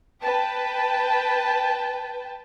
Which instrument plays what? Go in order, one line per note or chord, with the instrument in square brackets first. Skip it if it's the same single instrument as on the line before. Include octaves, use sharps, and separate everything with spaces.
[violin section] B4 G5 A5